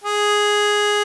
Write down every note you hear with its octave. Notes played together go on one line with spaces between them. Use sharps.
G#4